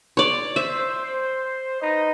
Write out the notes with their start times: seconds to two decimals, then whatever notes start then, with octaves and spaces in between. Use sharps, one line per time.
0.17 C#5 D5
0.56 C5 E5
1.81 D#4 B4 D#5